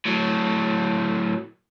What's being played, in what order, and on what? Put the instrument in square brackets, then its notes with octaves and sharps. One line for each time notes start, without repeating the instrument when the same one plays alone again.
[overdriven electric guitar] A2 F#3